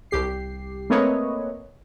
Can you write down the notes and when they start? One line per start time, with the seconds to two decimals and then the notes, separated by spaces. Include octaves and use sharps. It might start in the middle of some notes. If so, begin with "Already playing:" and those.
0.11 C2 G4 C7
0.90 A3 A#3 C4 B4 C#5 D#5